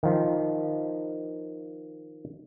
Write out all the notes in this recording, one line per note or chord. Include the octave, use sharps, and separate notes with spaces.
D#3 F3